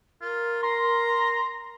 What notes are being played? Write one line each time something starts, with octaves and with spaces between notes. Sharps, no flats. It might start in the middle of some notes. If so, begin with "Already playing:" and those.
F4 A#4
A#5 C6